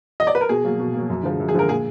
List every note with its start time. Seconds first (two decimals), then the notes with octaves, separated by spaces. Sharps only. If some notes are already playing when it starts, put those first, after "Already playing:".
0.20 D#5
0.27 D5
0.35 B4
0.41 A#4
0.49 B2 G#4
0.64 F#3 A#3
0.80 B2
0.94 F#3 A#3
1.10 F#2
1.23 D3 F3 G#3
1.40 F#2
1.49 G#4
1.54 D3 F3 G#3 A#4
1.69 A#2 G#4